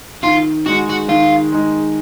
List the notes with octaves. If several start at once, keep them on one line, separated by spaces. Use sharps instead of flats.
D#3 F4
G#3 D#4 F#4
F#4
D#3 F4
G#3 D#4